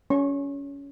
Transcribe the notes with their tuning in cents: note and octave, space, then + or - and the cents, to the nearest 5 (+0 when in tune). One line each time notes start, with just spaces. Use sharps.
C#4 +20 C#6 -35